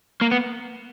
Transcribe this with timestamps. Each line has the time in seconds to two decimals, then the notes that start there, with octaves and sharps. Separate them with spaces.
0.21 A#3
0.31 B3